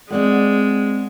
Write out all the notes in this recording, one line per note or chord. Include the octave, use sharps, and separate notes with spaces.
G#3 C4 D5 F#5